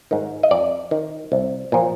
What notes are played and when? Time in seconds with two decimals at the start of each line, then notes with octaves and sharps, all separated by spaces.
0.11 G#2 D#3
0.43 D#5
0.51 F2 D5
0.91 D#3
1.32 C2
1.72 A#2 F3